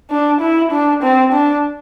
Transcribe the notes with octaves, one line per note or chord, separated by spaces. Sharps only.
D4
E4
D4
C4
D4